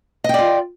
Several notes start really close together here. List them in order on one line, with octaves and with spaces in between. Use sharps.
D#5 G5 D5 F4